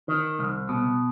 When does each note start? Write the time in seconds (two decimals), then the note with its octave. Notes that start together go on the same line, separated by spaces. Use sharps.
0.08 D#3
0.39 C2
0.69 B2